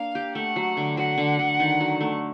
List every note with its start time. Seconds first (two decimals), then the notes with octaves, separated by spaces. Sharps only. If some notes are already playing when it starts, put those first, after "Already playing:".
Already playing: A#3 D4 F5
0.15 G4
0.35 A3 F#5
0.56 F#3
0.77 D3
0.97 F#3 F#5
1.18 D3
1.39 D3
1.60 D#3
1.80 F#3
2.01 A3